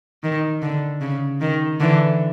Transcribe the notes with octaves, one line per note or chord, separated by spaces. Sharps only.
D#3
D3
C#3
D#3
D3 E3